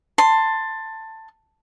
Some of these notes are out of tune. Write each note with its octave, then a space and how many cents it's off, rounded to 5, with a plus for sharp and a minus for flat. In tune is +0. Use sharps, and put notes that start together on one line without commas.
A5 +15 C6 +0